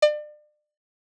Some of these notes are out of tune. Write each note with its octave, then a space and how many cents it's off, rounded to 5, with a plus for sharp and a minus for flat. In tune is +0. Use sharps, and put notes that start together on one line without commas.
D5 +35